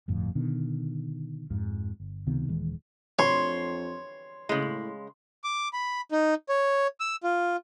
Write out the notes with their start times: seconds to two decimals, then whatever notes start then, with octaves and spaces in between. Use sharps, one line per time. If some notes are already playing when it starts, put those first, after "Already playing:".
0.08 G1 F2 A2
0.35 B2 D3 D#3
1.50 F2 G#2 F3
2.00 G1
2.27 C#2 C3 D#3 B3
2.48 D#1 D#3 E3 G#3
3.19 F2 C#5 C6
4.49 A2 C#3 G#3
5.44 D6
5.73 B5
6.12 D#4
6.49 C#5
7.00 E6
7.24 F4